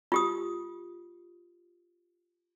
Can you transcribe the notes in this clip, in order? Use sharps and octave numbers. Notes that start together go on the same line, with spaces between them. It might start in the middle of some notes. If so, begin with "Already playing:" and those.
F4 G4 D#6